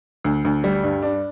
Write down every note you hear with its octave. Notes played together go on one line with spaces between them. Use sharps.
D2
D2
G3
G2
D4